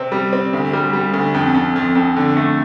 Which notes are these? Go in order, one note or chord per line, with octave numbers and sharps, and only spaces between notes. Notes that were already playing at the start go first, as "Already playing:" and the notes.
Already playing: C3 C4
G3
C4
D2
G3
G3
D2
F2
F2
F2
F2
D3
A3